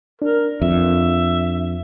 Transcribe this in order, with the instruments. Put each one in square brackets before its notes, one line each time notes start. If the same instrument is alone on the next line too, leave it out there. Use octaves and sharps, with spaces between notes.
[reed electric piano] D4 [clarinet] A#4
[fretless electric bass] F2 [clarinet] E5